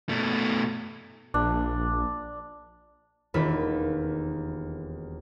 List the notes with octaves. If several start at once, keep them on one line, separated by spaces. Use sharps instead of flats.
B2 A3
A#1 D4
E1 D#2 F4 B5